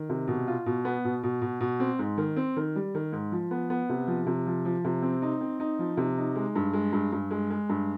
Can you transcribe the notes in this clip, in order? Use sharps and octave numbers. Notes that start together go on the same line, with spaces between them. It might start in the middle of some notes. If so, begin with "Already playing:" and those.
Already playing: D#3
C3
B2
F4
B2
B3
B2
B2
B2
B2
C4
G#2
D#3
C4
D#3
G3
D#3
G#2
F3
B3
B3
C3
F3
C3
F3
F3
C3
C4
D#4
C4
D#4
F3
C3
D#4
G#3
G2
G#3
G2
G2
G#3
G#3
G2